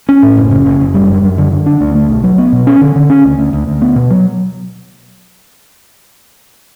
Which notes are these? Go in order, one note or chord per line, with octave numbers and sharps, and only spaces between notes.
C#4
A2
F#1
C#3
F#1
F#1
G3
F#2
F#2
D3
D3
D4
D2
A3
B1
F#3
B3
B2
C#4
D3
D3
C#4
D2
D2
D2
D2
B3
B2
F#3